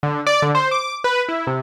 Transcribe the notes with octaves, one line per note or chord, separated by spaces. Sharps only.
D3
D5
D3
C5
D6
B4
E4
C3